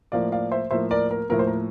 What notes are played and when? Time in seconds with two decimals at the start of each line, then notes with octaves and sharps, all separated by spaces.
0.12 A2 F3 A#3 D5 F5
0.32 D5 F5
0.52 C5 E5
0.71 A2 F3 A#3 C5 E5
0.91 A#4 D5
1.11 A#4
1.29 A2 F3 A#3 A#4
1.39 C5
1.47 A#4